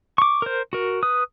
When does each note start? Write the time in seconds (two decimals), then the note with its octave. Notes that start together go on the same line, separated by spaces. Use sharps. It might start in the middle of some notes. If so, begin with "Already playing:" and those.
0.18 C#6 D6
0.42 A#4 C5
0.73 F#4 A#4
1.03 B4 D#6